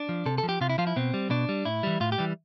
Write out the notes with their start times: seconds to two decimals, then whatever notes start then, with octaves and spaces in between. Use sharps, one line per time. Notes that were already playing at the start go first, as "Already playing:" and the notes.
Already playing: D4
0.09 F3
0.26 C3 A4
0.38 A4
0.43 F3
0.49 G4
0.61 C3 F4
0.70 E4
0.78 F3 F4
0.87 E4
0.96 B2 C4
1.14 G3
1.30 B2 D4
1.49 G3
1.65 A2 E4
1.83 E3 G3
2.00 A2 F4
2.12 G4
2.18 E3 G3